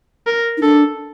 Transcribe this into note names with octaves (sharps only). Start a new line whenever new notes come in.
A#4
D#4
D4 A4